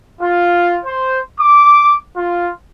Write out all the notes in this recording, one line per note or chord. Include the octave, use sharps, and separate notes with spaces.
F4
C5
D6
F4